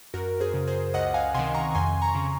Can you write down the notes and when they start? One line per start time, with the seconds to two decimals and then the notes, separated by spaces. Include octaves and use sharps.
0.14 F#2 F#4 A#4
0.40 G#4 C5
0.54 C#3
0.68 G#4 C5
0.94 C#2 D#5 F#5
1.14 F5 G#5
1.34 C3 D#3 G#5 C6
1.54 A#5 C#6
1.75 F2 G#5 C6
2.01 A#5 C#6
2.15 C#3